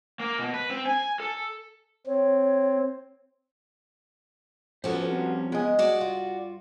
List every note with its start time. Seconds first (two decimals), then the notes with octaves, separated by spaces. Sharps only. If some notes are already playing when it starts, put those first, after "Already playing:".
0.20 A#3
0.39 B2
0.54 B4
0.70 C4
0.86 G#5
1.20 A4
2.07 C4 C#5
4.84 B1 F3 B3 C#4 F#4 G4 A4 C5
5.09 G3 C4 F4
5.52 G#3 B3 D#5 F5 G#5
5.79 G2 F#4 D5
6.01 F4